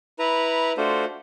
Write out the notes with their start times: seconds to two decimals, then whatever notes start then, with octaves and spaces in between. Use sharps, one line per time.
0.19 E4 B4 A#5
0.77 A3 D4 F4 F#4 C5